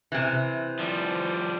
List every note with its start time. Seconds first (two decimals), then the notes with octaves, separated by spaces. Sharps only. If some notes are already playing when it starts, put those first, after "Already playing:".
0.12 C3 E3
0.79 F3 G3